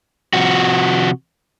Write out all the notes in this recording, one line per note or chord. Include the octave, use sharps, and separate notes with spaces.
C3 F3 F#4